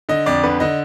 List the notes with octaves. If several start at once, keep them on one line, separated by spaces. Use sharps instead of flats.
D3 D#5
F2 D5
D3 B4
D3 D#5